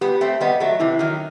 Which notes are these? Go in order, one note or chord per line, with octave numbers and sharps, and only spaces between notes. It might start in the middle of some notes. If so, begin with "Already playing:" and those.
G3 B3 G4
A3 C4
G3 B3 D#5 F#5
F#3 A3
C3 E3 E4
D#3 F#3